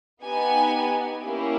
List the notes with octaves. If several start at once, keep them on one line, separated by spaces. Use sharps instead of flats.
B3 D#4 G4 G#5
A#3 C#4 E4 G4